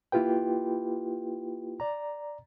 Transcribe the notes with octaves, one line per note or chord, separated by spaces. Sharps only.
A#3 E4 F4 G4 B4 G5
D5 A#5